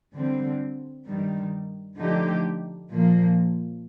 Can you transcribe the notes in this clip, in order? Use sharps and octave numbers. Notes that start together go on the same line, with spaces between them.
D3 G3 C4
G2 D#3 G3
D3 F3 A3 D#4 G4
A#2 F3 A#3